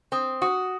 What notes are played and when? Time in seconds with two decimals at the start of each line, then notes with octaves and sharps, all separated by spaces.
0.12 C4 D#6
0.42 F#4 D#6